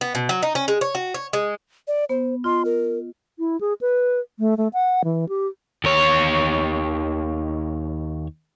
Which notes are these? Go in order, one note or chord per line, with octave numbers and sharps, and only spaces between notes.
B3
B2
F#3
D#4
C#4
G#3
C#5
F#4
C#5
G#3
D5
B3 C5
F4 D#5 C6
A#4
E4
G#4
B4
A3
A3
F#5
E3
G4
D#2 C#5